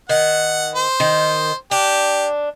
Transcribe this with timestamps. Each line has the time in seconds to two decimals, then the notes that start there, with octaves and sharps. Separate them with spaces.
0.09 D#3 F#5
0.75 C5
1.00 D#3
1.71 D4 G4